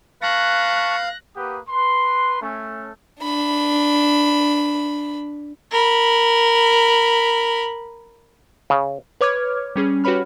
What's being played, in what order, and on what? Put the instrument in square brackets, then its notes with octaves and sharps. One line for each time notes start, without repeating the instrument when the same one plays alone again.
[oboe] B4 [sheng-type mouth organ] F5 [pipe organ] A5 C#6 [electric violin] F#6 A#6
[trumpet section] A#3 G4 B4 F#5 D#6
B4 C6
A3 C#4
[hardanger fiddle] D4 B5
[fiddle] A#4 B5
[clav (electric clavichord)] C#3
[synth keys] B4 C#5 D6 F6 G#6
G3 C#4 G#4
F#4 G4 B4 C#5 B5 F6